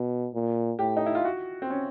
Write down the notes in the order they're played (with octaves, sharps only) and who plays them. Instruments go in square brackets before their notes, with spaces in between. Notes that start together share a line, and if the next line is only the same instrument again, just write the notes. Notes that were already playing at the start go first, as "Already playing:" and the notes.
Already playing: [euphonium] B2
A#2
[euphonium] A2 [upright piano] G4
[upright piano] D#4
E4
F4
F#4
C4
C#4